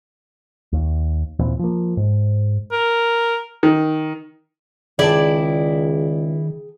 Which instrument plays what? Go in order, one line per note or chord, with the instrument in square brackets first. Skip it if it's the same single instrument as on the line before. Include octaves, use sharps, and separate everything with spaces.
[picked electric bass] D#2
D#2 A#2 E3 C4
F3 A#3
G#2
[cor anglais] A#4
[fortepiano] D#3
[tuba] C#2 [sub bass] D#3 [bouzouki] E4 D5 [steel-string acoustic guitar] G#4 G5 A5